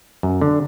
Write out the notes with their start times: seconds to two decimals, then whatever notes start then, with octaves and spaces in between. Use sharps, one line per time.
0.23 F#2
0.41 D3